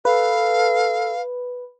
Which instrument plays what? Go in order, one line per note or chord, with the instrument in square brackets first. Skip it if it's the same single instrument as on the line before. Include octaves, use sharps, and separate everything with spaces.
[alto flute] A4 [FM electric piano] B4 [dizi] F5